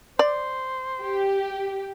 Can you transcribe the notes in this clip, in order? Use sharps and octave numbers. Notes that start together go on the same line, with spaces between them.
C5 D5
G4